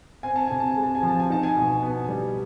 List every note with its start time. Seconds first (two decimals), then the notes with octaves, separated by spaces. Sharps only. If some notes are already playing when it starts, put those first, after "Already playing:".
0.23 C4 G#5
0.36 A5
0.47 C3 G#5
0.60 A5
0.71 G#5
0.77 G#3
0.83 A5
0.95 G#5
1.03 F3 A5
1.20 G#5
1.30 D#4 A5
1.43 G#5
1.56 B2
1.83 B3
2.09 G3